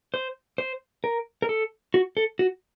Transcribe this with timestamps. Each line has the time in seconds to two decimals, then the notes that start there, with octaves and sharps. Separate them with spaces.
0.14 C5
0.58 C5
1.04 A#4
1.42 A#4
1.49 A4
1.94 F#4
2.17 A4
2.39 F#4